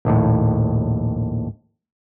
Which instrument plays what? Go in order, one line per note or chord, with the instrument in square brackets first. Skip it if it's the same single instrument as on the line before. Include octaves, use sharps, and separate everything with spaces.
[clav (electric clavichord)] A#1 D#2 A2